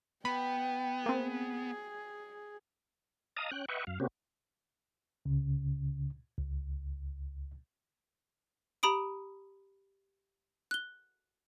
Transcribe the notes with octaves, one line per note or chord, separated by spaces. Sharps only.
B3 G5 B5
A#3 C4 G#4
D#5 F5 A5 A#5 D#6
C#4 G5 F#6
B4 D#5 E5 F#5 G5 C#6
F#2 F5
C3 A#3 C4 C#4 F#4 G4
C#2 C#3
C#2
G4 A#5 B5 D#6 D7
F#6 G7